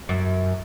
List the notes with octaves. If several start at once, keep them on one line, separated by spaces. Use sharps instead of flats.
F#2